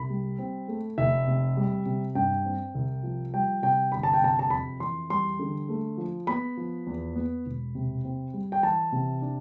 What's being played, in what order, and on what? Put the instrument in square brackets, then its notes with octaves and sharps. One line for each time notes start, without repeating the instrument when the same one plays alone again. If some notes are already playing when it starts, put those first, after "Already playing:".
Already playing: [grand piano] C2 B5
G3
C4
A3
F1 E5
C3
G3
C3
G2 G5
C4
C2
F3
G3 G5
C3 G5
G1 B5
A5
G5
C3 A5
A5
F2 B5
E3 C6
G3 C6
D3
A3
F3
B3 B5
F3
E2
B3
E1
C3
C4
G3
G5
E3 A5
C3
D4